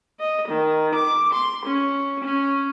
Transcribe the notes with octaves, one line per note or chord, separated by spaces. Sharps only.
D#5
D#3
D6
C6
C#4
C#4